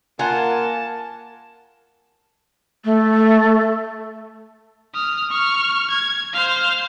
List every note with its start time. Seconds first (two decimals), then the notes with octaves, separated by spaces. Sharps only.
0.19 A#3 F4 A#4 F#5 G#5 A5
2.85 A3
4.94 D#6 F6
5.30 C#6 F6
5.90 G#6
6.33 C5 F5